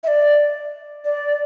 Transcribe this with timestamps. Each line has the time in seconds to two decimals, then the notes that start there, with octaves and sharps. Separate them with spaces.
0.03 E5
0.07 D5
1.05 D5